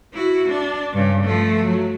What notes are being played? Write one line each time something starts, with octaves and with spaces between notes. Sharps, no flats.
E4 F#4
D4
G2 C#3
F3 A3
F#3